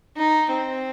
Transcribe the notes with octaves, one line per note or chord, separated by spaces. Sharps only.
D#4
C4